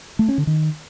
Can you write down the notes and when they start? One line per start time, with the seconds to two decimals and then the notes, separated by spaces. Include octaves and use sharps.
0.19 A3
0.28 C#4
0.38 D3
0.47 D#3